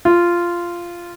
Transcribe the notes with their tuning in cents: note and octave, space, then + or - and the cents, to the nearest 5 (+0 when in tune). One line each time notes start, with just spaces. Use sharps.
F4 -10